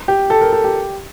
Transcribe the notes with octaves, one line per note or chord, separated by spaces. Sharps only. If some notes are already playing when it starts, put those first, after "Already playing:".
G4
A4
A#4
A4
G4